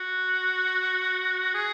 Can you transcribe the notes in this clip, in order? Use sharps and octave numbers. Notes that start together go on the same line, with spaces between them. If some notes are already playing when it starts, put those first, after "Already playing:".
Already playing: F#4
G#4